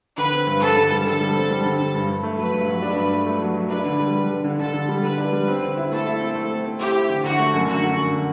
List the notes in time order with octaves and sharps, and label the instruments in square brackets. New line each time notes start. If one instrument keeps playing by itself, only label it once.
[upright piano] D3 [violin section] B4
[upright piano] C4
G2
[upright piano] G2 [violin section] A4
[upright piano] D3
G3
[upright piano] D3 [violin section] A4
[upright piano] G3
C4
G3
D3
D3
G2
G2
A3
[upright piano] F#3 [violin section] B4
[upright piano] G2
F#3
D4
G2
A3
A3
F#3
F#3
[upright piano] D4 [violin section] B4
[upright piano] D3
G3
G3
D3
D3
[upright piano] D3 [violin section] A4
[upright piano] D3
G3
[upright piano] D3 [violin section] B4
[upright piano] D4
G3
C4
D3
E4
[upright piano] A3 [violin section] A4
[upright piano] E4
C4
A3
C4
C4
[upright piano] E4 [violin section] G4
[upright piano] E4
D3
[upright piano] D3 [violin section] F#4
[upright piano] A3
F#2
[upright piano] D3 [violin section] F#4
[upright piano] D3
F#2
D3